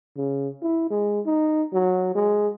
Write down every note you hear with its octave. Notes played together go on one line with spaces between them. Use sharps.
C#3
E4
G#3
D#4
F#3
G#3